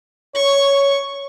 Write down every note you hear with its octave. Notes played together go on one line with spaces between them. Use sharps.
C#5 C#6